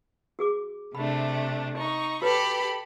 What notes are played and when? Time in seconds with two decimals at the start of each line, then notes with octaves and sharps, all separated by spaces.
0.39 F#4 G#4 D6
0.95 C3 A3 D4 B5
1.77 D#4 C#6
2.22 F#4 G4 A4 B4 C#5 B5